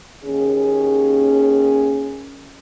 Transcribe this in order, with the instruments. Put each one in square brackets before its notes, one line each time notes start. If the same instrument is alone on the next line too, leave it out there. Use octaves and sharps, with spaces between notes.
[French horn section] D#2 C#4 G#4